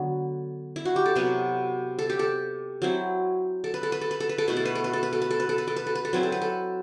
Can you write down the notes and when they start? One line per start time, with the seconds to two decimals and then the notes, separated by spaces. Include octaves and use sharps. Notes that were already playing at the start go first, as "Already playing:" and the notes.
Already playing: D3 F#3 B3
0.76 E4
0.85 F#4
0.96 G4
1.06 A4
1.15 C3 F#3 B3 B4
1.99 A4
2.10 G4
2.19 A4
2.82 F#3 C4 E4
3.64 A4
3.74 B4
3.83 A4
3.92 B4
4.01 A4
4.11 B4
4.20 A4
4.29 B4
4.38 A4
4.48 B2 A3 E4 B4
4.57 A4
4.65 B4
4.75 A4
4.84 B4
4.93 A4
5.03 B4
5.13 A4
5.22 B4
5.31 A4
5.40 B4
5.49 A4
5.58 B4
5.68 A4
5.76 B4
5.87 A4
5.95 B4
6.05 A4
6.13 F#3 C4 E4 B4
6.23 A4
6.32 B4
6.41 A4